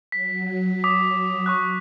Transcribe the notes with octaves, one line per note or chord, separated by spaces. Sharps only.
F#3 B6
D6 D#6 B6
C#6 D#6 F#6